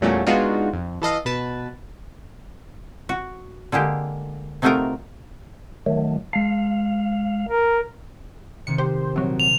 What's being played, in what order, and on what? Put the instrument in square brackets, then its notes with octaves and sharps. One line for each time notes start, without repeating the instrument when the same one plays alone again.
[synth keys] E2 A#2 F#3 G3 A3 C#4
G#3 B3 D4 D#4 F4 F#4
F2
E3 A4 D#5 F5
B2 B4 A5
[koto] F#4
D3 G#3 A#3 G4
C3 F#3 A3 D#4 F4 A#4
[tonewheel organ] D#3 F#3 A3
[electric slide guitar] G#3 A5 [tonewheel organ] F5
[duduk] A#4
[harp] C3 D#3 C4 [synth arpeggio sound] C#7
[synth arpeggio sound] G4 C5
[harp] A#1 [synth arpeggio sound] C3 F#3
[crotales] F7